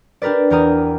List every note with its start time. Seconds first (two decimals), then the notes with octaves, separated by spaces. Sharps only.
0.22 D4 G4 A#4 B4 D5
0.50 E2 G4 A#4 A#5 D#6